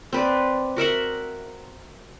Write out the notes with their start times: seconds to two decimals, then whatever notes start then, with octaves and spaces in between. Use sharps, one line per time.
0.13 C4 B4 D5
0.76 F#4 A#4 E5 F#5